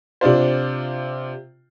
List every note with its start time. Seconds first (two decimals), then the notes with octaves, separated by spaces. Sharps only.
0.21 C3 D4 F4 C5